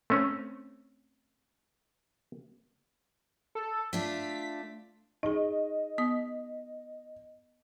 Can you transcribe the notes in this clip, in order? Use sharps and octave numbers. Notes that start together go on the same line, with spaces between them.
A3 C4 C#4
A4
A3 D4 F4 B6
D#4 G#4 D#5
B3 D#6